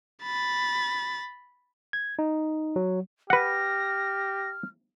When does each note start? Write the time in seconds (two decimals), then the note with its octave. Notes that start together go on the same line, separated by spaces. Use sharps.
0.23 B5 A6
1.93 G#6
2.19 D#4
2.76 F#3
3.30 G4 B4 F#5 F6 A#6